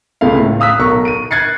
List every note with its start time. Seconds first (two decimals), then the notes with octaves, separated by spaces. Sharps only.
0.21 C#2 C3 G#3 A3 E4 F5
0.39 A2
0.60 F5 D#6 E6 F#6 B6
0.79 B1 A#4 C#6
1.05 D7 D#7
1.31 F#6 G#6 A6 C7 C#7